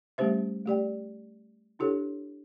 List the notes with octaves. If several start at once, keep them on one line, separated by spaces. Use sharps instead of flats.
G3 A3 C#4 G4 C5 E5
A3 G4 D5 G5
D4 E4 G4 A4 C#5